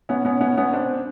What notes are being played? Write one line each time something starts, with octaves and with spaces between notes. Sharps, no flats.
B3 C#4
B3 C#4
B3 C#4
B3 C#4
C4 D4